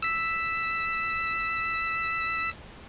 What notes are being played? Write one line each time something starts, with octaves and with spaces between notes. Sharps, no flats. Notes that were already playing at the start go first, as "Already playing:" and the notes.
E6 B6